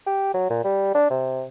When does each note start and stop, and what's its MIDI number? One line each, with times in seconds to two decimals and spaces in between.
0.06 0.33 67
0.34 0.47 54
0.50 0.64 46
0.64 0.93 55
0.95 1.07 62
1.10 1.44 48